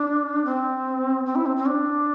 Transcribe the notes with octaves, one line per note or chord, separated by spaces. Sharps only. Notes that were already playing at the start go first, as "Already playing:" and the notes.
Already playing: D4
C4
C4
E4
C4
C4
D4